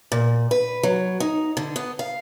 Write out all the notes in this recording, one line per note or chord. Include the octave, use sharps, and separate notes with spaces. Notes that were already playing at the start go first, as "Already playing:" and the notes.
A#2
B4
F#3
D#4
D3
B3
F5